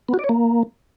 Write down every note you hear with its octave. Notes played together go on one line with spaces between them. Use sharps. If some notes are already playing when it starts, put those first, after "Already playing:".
B3
F#4
D5
C#5
A#3